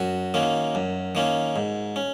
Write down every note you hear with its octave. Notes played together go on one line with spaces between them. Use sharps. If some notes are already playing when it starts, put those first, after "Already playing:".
Already playing: F#2 F#4
D#3 A#3 C#4
F#2
D#3 A#3 C#4
G#2
C#4